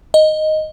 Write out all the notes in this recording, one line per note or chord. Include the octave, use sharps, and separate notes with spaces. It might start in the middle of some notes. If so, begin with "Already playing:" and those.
D#5